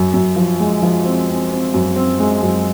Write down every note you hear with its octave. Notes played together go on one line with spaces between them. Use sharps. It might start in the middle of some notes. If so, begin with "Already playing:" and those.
Already playing: F#2
F#2
F3
G#3
F3
C4
C4
C4
F#2
C4
G#3
F#2